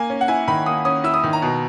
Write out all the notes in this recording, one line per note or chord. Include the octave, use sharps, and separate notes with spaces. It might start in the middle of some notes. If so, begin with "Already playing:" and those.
Already playing: A#3 G#5
C#4
F#5
E4 G#5
D#3 B5
A#3 D#6
C#4 D#6
E4 E6
D#6
D#3
A#5
B2